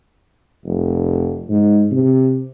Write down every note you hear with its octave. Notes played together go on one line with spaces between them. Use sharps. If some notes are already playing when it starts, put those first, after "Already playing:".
F1
G#2
C3